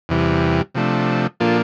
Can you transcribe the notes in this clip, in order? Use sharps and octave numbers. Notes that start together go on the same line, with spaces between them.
E2 C3 E3 G3
C3 F3 A3 D4
A#2 F3 A#3 D4 F4 A4